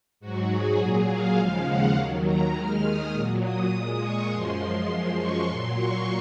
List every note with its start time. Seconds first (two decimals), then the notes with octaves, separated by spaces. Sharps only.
0.20 G#2 F#3 F#4
0.50 G#4
0.79 A#2 F#3
1.08 F5
1.37 D#2 C#3 F3 G#3
1.67 F#5
1.96 D#2 D#3 F#3
2.25 A#5
2.54 D#2 D#3 G#3 F6
2.84 D#6
3.13 A#2 F#3
3.43 D#6
3.72 A#2 G#3 D#6
4.01 C#6
4.30 F#2 F3 G#3 C6
4.88 F#2 F3 G#3 C6
5.18 C#6
5.47 A#2 F#3 C6
5.76 C#6